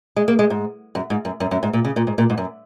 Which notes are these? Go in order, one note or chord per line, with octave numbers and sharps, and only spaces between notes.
G#3
A#3
G#3
G#2
F#2
G#2
F#2
F#2
F#2
G#2
A#2
C#3
A#2
G#2
A#2
G#2
F#2